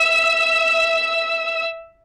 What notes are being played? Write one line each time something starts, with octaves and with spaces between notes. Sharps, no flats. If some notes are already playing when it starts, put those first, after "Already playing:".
Already playing: E5 E6